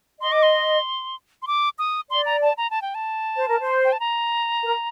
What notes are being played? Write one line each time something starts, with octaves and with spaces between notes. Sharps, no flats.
D#5 C6
D6
C6
C6
D6
D#6
D5 C6
A#5
A5
A#5
A5
G5
A5
C5
A#4
C5
G5
A5
A#5
A#4